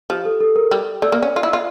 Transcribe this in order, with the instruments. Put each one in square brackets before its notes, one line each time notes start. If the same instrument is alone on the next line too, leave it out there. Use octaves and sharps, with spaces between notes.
[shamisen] F3 [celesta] G4
[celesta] A4
A4
A#4
[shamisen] G3
[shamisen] A3 [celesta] D5
[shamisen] A#3
C#4
F4
E4
F4